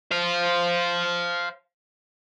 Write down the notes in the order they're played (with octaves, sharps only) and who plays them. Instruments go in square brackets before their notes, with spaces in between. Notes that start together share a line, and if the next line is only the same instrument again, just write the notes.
[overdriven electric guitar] C5 F5